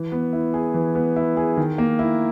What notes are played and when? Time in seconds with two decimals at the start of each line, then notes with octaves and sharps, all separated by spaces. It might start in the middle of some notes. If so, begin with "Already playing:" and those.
Already playing: E3
0.12 B3
0.33 E4
0.54 G#4
0.74 E3
0.95 B3
1.16 E4
1.37 G#4
1.57 D#3
1.78 A#3
1.99 E4